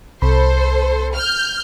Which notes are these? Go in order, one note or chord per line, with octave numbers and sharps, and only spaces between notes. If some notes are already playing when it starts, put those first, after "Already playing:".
C2 A4 C5 B5
F6 G6